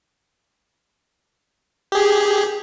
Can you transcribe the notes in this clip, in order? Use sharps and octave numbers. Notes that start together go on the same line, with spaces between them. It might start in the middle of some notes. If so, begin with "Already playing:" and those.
G4 G#4